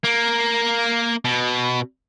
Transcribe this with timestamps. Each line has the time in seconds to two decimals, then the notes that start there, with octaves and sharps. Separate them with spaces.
0.04 A#3
1.25 B2